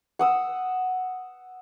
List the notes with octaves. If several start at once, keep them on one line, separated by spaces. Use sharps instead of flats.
F#5 D#6 E6